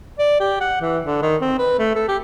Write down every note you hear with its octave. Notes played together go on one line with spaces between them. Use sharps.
D5
G4
F#5
E3
D3
D#3
C4
B4
A3
A4
G4